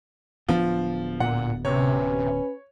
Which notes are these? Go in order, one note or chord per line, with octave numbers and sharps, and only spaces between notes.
D1 F3 B3 D4
A#2 F#5
C3 C#4 B4 C#5